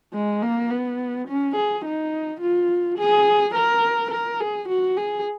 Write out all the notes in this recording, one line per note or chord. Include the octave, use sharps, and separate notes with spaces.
G#3
A#3
B3
C#4
G#4
D#4
F4
G#4
A#4
A#4
G#4
F#4
G#4